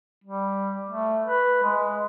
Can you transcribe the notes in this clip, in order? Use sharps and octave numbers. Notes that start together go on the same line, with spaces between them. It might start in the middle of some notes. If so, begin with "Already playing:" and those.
G3
A3
B4
G#3